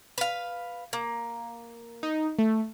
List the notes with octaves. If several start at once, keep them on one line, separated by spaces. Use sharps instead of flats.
B4 F5
A#3
D#4
A3